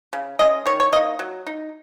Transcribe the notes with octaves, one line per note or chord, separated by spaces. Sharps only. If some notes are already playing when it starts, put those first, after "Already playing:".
C#3
G#3 C#4 D#5
D#3 C#5
C#5
A#3 D#4 D#5
F#3
D#4